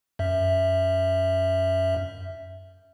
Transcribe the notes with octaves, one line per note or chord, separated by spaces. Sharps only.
F#2 E5